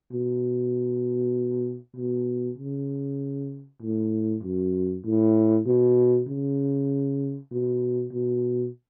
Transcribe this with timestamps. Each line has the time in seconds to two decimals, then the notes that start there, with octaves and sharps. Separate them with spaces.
0.12 B2
1.96 B2
2.58 C#3
3.82 A2
4.43 F#2
5.05 A2
5.67 B2
6.28 C#3
7.52 B2
8.12 B2